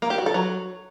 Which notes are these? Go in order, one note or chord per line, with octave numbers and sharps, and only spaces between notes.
A#3
G4
F#4
A4
F#3